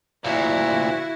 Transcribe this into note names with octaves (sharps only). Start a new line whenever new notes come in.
D2 A#2 E4 F#4